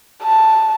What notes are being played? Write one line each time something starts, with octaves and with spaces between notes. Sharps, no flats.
A5